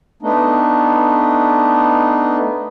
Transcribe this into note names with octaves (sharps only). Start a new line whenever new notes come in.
A3 B3 D4 D#4